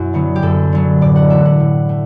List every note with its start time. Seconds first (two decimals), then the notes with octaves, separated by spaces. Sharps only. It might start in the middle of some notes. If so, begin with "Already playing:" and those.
Already playing: F#2 B2 E4 F#4
0.13 D3 F#3 B3
0.36 G4
0.42 F#2 A4
0.72 D3 F#3 B3
1.01 A2 D5
1.16 F#5
1.30 E3 A3 E5
1.45 F#5
1.60 A2
1.89 A3